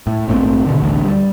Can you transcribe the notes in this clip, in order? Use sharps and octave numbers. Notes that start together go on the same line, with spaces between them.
A2
A#1 G#2 A3 C4
B2 D3
A1 D2
G3